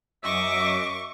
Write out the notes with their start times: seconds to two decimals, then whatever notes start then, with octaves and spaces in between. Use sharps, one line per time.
0.24 F#2 D#5 E5 C#6 D6